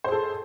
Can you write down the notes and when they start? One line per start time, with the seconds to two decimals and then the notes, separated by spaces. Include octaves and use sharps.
0.04 C5
0.08 G#4
0.12 A4